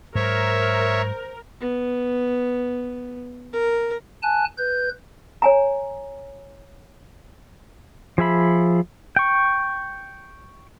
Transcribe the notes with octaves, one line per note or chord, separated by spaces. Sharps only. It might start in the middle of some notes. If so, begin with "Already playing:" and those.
G#2 F#3 A#4 C5 C#5 E5
B3
A#4
G#5 A5 F#6
B4 G6
C#5 G#5 A#5
F3 G#4 E5 B5
G5 C#6